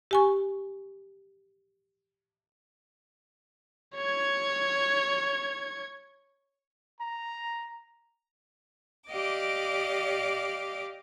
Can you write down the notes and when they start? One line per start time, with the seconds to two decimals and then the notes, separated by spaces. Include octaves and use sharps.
0.11 G4 G#5 C#6
3.95 C#5 G#6
6.99 A#5
9.10 G4 D5 D#5 F5 D6